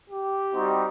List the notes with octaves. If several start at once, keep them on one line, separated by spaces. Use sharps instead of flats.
G4
G3 C4 D#4 F#4